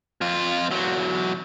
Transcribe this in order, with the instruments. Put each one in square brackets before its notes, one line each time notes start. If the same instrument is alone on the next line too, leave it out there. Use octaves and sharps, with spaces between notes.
[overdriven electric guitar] F2 F4
E2 F#3